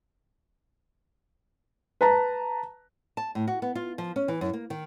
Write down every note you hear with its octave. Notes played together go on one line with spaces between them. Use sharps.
B4 A5 A#5
A5
A2
F#4
B3
F4
F3
C#4
E3
F#2
A#3
D#3